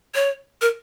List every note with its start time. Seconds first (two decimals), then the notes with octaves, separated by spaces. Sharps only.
0.15 C#5
0.61 A#4